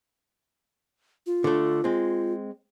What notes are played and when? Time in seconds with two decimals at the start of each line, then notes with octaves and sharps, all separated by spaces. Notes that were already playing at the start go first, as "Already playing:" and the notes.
1.26 F4
1.44 D3 A3
1.84 G#3 C4